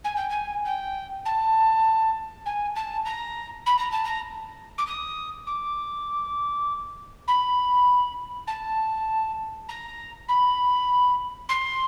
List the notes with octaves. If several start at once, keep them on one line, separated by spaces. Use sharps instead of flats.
G#5
G5
G#5
G5
A5
G#5
A5
A#5
B5
A#5
A5
A#5
D6
D#6
D6
B5
A5
A#5
B5
C6